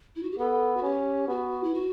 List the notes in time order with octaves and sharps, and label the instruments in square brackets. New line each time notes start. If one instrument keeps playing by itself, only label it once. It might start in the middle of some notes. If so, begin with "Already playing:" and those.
[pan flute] E4
F#4
G4
[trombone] B3 [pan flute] A4
[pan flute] F#4
[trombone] C#4 [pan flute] G4
[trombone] B3 [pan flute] F#4
[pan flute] E4
F#4